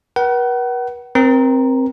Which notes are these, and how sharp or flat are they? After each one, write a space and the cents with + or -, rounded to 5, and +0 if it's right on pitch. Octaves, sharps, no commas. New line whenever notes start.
B4 -45 F#5 +35
C4 +5 A#4 +30 A#5 +0